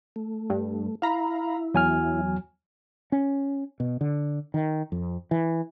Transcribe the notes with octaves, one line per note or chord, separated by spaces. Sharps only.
A3
G2
E4 F5 A#5 B5
E2 F#3 G#5 F6
C#4
B2
D3
D#3
F2
E3